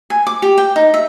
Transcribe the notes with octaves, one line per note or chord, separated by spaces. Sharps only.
G#5
D6
G4
G5
D#4
E5